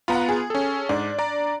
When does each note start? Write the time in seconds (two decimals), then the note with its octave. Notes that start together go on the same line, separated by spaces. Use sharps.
0.08 B3 F4 F#5 A#5 B5
0.29 G#4
0.50 C#4 A4
0.89 G#2 D4
1.19 D5 A#5